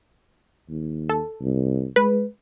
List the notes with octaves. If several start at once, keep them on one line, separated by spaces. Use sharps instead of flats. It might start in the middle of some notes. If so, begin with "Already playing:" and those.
D#2
A4
C2
G#3 B4